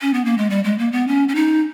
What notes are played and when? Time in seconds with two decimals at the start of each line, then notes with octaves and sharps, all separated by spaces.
0.01 C#4
0.14 B3
0.25 A#3
0.38 G#3
0.50 G3
0.64 G#3
0.78 A#3
0.92 B3
1.08 C#4
1.28 C#4
1.35 D#4